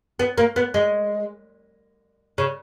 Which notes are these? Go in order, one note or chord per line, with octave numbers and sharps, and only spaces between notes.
B3
A#3
B3
G#3
C#3